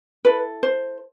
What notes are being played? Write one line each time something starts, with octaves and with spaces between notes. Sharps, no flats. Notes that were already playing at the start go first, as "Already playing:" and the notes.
E4 A4 B4
C5